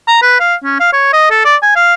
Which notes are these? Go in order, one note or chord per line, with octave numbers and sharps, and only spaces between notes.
A#5
B4
F5
C#4
F5
C#5
D#5
A4
D5
G#5
F5